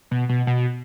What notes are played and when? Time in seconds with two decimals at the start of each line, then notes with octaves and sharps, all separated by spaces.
0.11 B2
0.29 B2
0.47 B2